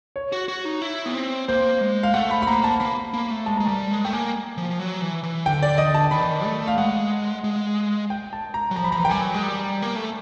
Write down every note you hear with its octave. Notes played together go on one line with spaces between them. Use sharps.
C#5
F#4
F#4
D#4
E4
B3
C4
A#3 C5
G#3
F5
A3 F#5
B5
B5
A#3 A#5
A5
A#3 B5
A#3
A3
G#3 A5
G#3 A#5
G3 A5
G#3
A3 G5
A#3 G#5
F3
F#3
E3
E3
D3 G5
D5
D#5
A5
D#3 B5
E3
D#3
A3
F5
G#3 F#5
G#3
G5
A5
A#5
F#3
F3 A#5
B5
F3 A#5
E3
G5
G3 G#5
F#3
G#3
G3
A#3
A3